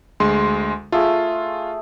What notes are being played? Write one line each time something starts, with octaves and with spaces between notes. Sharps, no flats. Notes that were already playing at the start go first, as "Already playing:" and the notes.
D2 G#3 C6
A3 F4 G#4